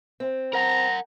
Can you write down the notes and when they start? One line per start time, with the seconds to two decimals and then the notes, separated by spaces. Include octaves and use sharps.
0.20 C4
0.53 A#4 F#5 A#5